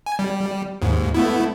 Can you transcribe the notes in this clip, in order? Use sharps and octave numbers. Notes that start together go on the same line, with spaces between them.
G#5
G3
D#2 G#2
A3 B3 E4